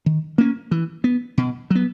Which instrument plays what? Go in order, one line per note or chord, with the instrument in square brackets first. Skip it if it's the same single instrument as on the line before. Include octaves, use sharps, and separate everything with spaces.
[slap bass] D#3
A#3 C#4
E3
B3
B2
F#3 B3